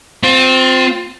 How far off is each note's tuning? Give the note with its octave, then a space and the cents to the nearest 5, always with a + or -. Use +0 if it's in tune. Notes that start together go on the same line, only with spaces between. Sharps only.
C4 -10 F4 +30